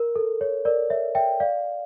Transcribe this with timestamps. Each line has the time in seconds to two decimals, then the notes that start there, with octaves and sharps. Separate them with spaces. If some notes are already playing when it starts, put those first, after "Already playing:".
Already playing: A#4
0.16 A4
0.41 C#5
0.65 A#4 D5
0.90 C#5 E5
1.15 E5 G5
1.40 D5 F5